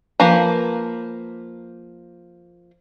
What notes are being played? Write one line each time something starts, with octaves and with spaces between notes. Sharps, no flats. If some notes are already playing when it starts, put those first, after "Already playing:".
F3 A#3 B4 A#5